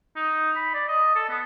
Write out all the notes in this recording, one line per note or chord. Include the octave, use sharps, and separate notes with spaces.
D#4
B5
D5
D#5
A4
B3